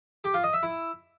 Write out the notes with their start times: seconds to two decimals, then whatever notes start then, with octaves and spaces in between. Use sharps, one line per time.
0.24 G4
0.34 F4
0.44 D#5
0.53 E5
0.63 E4